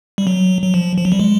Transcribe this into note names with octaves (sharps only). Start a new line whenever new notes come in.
G3
F#3
F#3
F3
F3
F#3
G3
G#3